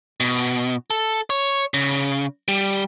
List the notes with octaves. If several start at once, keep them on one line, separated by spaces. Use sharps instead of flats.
B2
A4
C#5
C#3
G3